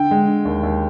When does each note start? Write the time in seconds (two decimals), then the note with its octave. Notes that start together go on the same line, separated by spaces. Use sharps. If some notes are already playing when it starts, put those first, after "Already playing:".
Already playing: D3 G5
0.11 G#3
0.27 D3
0.45 D#2
0.63 D#2